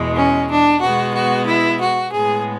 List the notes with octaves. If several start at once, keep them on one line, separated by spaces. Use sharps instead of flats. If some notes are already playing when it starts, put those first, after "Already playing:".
Already playing: E2 B2 G#3
C#4
D4
B2 G#3 B3 F#4
F#4
E4
F#4
A2 G#3 B3 G#4